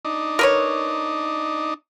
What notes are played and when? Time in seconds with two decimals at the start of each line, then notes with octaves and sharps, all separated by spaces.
0.05 D4 D#4
0.39 A#4 B4 C#5